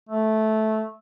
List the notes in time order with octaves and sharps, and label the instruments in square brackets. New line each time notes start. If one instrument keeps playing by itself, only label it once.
[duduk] A3